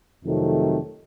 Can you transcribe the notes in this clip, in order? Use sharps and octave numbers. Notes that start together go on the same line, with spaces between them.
F2 C3 D#3 F#3 A3